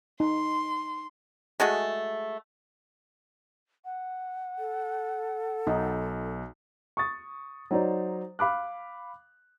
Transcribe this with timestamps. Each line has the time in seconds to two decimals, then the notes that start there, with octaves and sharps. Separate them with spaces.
0.20 D#4 C6
1.60 G#3 A3 F#4 G#4
3.85 F#5
4.58 A4
5.67 B1 D#4
6.97 C#6 D#6 A6
7.71 F#3 D#4 C5 D5
8.39 F5 B5 D6 F#6